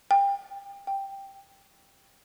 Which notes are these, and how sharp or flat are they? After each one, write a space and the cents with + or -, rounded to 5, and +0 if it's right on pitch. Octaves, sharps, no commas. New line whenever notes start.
G5 +25
G5 +5